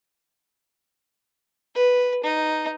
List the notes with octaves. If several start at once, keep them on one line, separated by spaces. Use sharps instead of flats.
B4
D#4